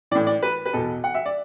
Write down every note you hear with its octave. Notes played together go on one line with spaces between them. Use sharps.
A2 E3 D5
D5
B4
B4
E2 B2 A4
F#5
E5
D5